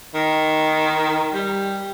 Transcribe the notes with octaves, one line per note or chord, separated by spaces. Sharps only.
D#3
G3